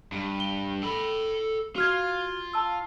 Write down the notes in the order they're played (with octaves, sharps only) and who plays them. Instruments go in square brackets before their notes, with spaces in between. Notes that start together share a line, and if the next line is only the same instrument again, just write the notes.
[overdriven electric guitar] G2
[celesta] G7
[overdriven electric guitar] A4 B5
[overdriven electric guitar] F4 [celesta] F#4 F6 G#6
[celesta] A5 E6